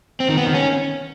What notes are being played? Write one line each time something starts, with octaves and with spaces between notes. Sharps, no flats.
C4
D#3
B3
D#3
C#4